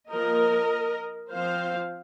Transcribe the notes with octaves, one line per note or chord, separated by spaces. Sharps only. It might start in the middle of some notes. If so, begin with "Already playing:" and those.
F3 A#3 A#4 D#5
F3 C4 C5 F5